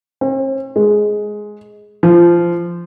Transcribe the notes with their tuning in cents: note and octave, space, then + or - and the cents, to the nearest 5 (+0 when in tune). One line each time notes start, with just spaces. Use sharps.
C4 +45
G#3 +5
F3 -20